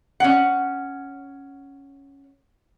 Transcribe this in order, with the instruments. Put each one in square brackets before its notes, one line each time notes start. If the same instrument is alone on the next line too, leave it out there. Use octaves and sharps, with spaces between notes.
[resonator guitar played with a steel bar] C#4 F#5